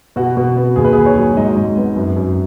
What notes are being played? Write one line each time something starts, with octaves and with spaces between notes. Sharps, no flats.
B2 F#4
B2
B3
D#2 G#4
B4
G#4
D#2
C#5
F#3
G#2 D#5
G#2
B3
F#2
F#2